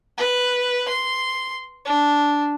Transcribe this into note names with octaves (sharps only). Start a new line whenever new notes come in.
B4
C6
D4